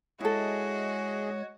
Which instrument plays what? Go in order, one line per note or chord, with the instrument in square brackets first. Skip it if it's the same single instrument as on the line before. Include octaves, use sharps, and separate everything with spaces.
[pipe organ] G#3 C#5 [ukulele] E4 A4 [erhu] F#4 [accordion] G#4 D#5